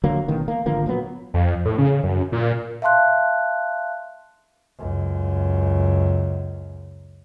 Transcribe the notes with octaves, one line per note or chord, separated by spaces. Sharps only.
D3 F#3 A#3
A1 B2 D#3
A#3
G#1 D3 F3 A#3
A#2 F#3 B3
F2
A2
C#3
F#2
A#2
E5 F5 A5 C6 F#6
C#2 F#2